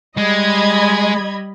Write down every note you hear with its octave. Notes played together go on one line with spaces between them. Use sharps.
G3 G#3 D#5 B5 G#6